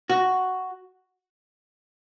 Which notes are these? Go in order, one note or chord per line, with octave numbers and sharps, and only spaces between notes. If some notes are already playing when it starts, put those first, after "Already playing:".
F#4